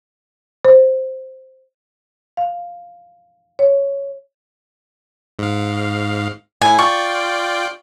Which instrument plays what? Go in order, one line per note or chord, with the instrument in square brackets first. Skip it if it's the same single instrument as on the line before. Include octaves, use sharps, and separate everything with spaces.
[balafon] C5
[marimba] F5
C#5
[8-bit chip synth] G#2 F5
[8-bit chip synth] A2 E4 [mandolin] G#5
[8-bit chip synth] F4 D5 G5 [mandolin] C#6